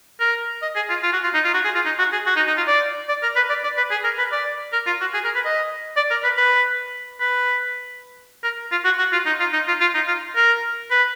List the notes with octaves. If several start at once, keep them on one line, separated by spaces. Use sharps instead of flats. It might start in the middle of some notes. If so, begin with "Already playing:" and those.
A#4
D#5
G#4
F4
F4
F#4
F4
D#4
F4
F#4
G#4
F4
D#4
F#4
G#4
F#4
D#4
D#4
F4
D5
D5
A#4
B4
D5
D5
B4
G#4
A#4
B4
D5
A#4
F4
F#4
G#4
A#4
B4
D#5
D5
A#4
B4
B4
B4
A#4
F4
F#4
F#4
F4
D#4
F4
D#4
F4
F4
D#4
F4
A#4
B4